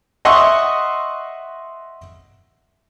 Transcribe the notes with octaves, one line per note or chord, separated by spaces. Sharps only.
D#5 E5 F#5 C6 C#6 D#6